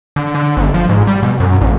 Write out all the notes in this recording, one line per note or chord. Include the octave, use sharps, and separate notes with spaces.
D3
D3
G1
F3
G#2
G3
B2
F#2
A1